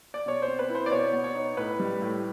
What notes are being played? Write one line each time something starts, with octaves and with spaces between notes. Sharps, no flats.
D5
B2 C#5
C5
C4
B4
E4 C5
D5
B2 C#5
B3
C#5
D#4
A2 B4
G3
A2